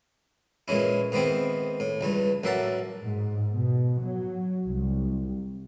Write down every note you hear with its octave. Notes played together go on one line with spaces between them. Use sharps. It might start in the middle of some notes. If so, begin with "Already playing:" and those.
A#2 E3 G#3 C#4 E4
G#2 D#3 B3 C4 E4
A2
C#2 G2 E3
A1 F#3 A#3 E5 F#5 A5
G#2
B2
F#3
C2